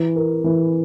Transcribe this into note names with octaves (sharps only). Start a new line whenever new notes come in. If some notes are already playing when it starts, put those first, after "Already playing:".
Already playing: E3
A#4
E3